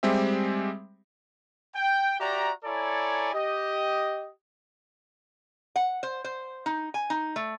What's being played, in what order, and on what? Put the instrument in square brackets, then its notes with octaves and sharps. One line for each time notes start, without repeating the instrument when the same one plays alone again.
[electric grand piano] G3 G#3 C4 G4 E5
[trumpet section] G5
F#4 G4 D5 E5 A#5
E4 A4 C#5 D5 G#5 A#5
G4 D#5
[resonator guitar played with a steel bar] F#5
C5
C5
D#4
G#5
D#4
A3